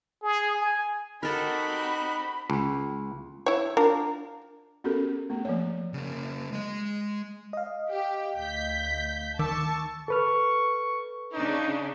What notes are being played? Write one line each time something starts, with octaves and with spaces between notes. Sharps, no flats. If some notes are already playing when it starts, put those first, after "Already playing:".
G#4
G#5
C4 D#4 F#4 G4 A4 A#4 B5 F#6
C#2
E4 C#5
D4 F4 A#4
B3 C#4 F#4 G4 A4 A#4
A3 B3
F3 A#3 C#5
C#3 A#3
G#3 D#5
D#5 F5
G4
D2 G6 B6
D#3 A5 C#6 D6 E6
A4 B4 C#6 F6
C#3 D4 D#4